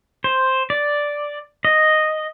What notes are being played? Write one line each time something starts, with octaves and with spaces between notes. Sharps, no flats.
C5
D5
D#5